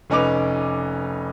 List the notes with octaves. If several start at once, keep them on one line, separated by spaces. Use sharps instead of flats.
F1 C#4 D#4 B4 D6 F7